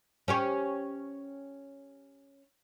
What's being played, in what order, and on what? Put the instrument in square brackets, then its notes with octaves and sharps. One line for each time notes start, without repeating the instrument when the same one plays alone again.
[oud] C#4 G4 C#5